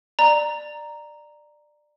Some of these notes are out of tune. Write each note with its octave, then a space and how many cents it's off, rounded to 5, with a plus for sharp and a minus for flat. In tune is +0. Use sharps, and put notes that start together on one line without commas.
D5 +20 A#5 +0